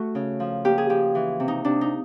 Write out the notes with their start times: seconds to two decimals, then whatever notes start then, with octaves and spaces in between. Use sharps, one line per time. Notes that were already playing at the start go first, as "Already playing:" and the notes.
Already playing: A3 F#4
0.15 C#3
0.40 F3
0.65 A#3 G4
0.78 G#4
0.89 F3 G4
1.15 E3
1.40 C3
1.48 D#4
1.65 C3 D4
1.81 D#4